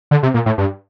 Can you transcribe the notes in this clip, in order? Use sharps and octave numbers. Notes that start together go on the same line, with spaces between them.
D3
C3
A#2
A2
G2